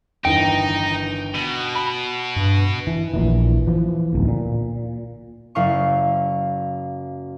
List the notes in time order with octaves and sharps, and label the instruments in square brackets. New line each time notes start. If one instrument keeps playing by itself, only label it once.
[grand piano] G1 D#3 E3 [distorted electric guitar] D#4 [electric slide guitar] G5
[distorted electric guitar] B2
[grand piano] B5
[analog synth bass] G2
[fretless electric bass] E3
A#1 A#2 E3
E3 F3
D1 B1
A#2
[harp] F#1 E4 F5 C#6